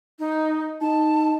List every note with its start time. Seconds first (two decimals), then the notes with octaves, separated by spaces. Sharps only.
0.19 D#4
0.81 D#4 A5